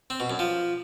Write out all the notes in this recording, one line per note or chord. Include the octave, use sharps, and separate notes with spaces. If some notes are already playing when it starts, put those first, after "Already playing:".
C4
B2
F#2
F3